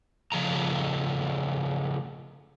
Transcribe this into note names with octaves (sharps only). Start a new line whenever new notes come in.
C#3 F3 A3 A#5